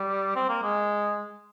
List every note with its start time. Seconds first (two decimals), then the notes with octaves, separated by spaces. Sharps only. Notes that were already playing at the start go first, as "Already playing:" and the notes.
Already playing: G3
0.36 C4
0.49 A#3
0.63 G#3